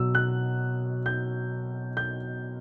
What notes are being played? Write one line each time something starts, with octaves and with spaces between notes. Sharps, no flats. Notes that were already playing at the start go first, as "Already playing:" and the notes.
Already playing: B2 F#3 E6
F#6
G6
G6